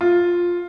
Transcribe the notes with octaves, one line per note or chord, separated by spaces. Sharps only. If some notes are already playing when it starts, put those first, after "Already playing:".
F4